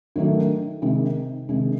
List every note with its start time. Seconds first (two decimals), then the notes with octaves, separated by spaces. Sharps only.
0.16 D#3 F#3 A3 D4
0.82 C3 D#3 G#3
1.49 C3 D#3 G#3